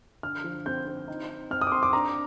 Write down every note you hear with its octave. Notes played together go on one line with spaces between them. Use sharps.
D3 F6
F3
C4 G6
C4
D#4
D#4
C4 F6
D#6
D6
C4 C6
D6
D4 A#5